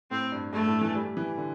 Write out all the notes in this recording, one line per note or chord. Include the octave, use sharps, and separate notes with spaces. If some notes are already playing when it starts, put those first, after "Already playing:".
A2 C4
G2
G2 A3
A2
E3
G3
E3
D3